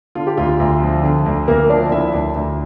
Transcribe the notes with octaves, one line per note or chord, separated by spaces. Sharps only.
D3 F4
G4
D2 F4
D2
F3
D3
D2
D2 A#3 A#4
F3 D4 D5
D3 E4 E5
D2 D4 D5
D2